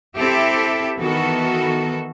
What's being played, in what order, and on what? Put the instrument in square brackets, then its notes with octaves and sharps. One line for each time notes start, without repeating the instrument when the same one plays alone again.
[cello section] C4 E4 G4 A4 E5
D#3 E3 B3 F#4 A4